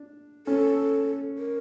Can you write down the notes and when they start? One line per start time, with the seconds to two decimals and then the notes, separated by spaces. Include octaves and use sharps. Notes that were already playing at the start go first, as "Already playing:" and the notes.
Already playing: D4
0.47 C#4 A4
1.38 A#4